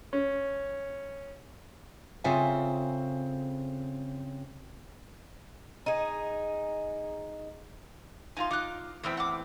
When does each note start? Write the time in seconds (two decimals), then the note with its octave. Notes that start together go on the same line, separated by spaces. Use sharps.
0.13 C#4
2.24 C#3 C4 F4 A4 E5 G#5
5.86 D#4 G#4
8.37 D#4 F4 F5 G#5 C6
8.51 D#4 F4 D6 F#6
9.03 E2 A2 C4 G#4 E5 G5
9.17 F#5 D6